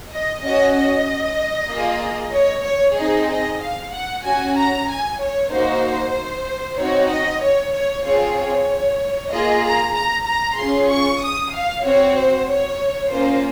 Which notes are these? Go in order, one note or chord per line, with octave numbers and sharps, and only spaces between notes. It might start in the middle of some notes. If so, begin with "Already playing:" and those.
D#5
C#4 F#4 D#5
D#5
A#3 F4 G#4
C#5
C#5
C4 D#4 G#4 D#5
D#5
F5
F#5
C#4 F#4 G#5
A#5
G#5
C#5
A#3 D#4 F#4 C5
C4 D#4 F#4 C#5
D#5
C#5
C#5
C4 F4 G#4 C#5
C#5
A#3 F4 G#4 D#5
A#5
A#5
A#5
C#4 F4 G#4 C6
C#6
D#6
F5
C4 F#4 C#5
C5
C#5
A#3 C#4 F4 C5